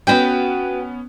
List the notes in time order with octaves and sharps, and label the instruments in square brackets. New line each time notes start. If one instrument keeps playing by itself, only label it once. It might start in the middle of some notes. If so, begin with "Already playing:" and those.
[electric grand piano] B3 C#4 [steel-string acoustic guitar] F#4 B4 G5